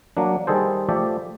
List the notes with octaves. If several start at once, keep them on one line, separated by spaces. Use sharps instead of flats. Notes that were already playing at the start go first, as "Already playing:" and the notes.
F#3 A#3 D4
D#3 G3 G#4 A4 C5
F3 A3 G4 D5 E5